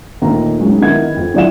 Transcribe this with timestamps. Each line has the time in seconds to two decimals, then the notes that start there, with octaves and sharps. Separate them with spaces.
0.22 D#2 A#2 D#3 A3 A#5
0.60 F#3 G#3 C#4 D#4
0.81 D#3 B3 E4 A#4 F#5 G#6
1.16 F2
1.34 E3 F#3 D5 F5 F#5 E7